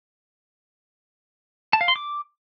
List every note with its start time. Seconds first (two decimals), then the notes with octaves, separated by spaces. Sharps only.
1.73 A5
1.81 F5
1.88 C6
1.96 D6